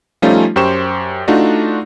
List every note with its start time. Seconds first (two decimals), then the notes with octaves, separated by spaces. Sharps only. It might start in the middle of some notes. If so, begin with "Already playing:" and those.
0.22 F3 G3 A3 C#4 D#4 F4
0.56 F#2 G4 C5 C#6 E7
1.28 A3 D4 D#4 F4 F#4